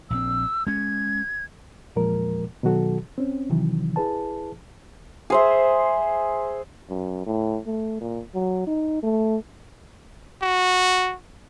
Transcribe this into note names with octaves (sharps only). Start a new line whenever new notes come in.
A#1 D3 C4 E6
G#3 C#4 G#6
E2 A#2 F3 G#3 A#4
B2 D#3 F#3 F#4 A4
C4 C#4
C3 D#3 E3 F#3
E4 G#4 B4 A5
G#4 C5 E5
F#2
A2
A3
A#2
F#3
D#4
A3
F#4